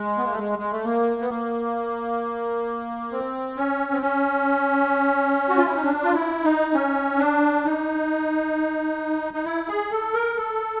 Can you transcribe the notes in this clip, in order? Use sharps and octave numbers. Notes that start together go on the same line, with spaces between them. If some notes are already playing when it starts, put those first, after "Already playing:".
Already playing: G#3
B3
A#3
A3
G#3
G#3
A3
A#3
B3
A#3
C4
C#4
C4
C#4
F#4
F4
E4
D#4
D4
F4
E4
D#4
C#4
D4
D#4
D#4
E4
G#4
A4
A#4
A4